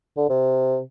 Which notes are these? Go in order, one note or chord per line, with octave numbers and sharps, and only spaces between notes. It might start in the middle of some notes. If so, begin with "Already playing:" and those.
D3
C3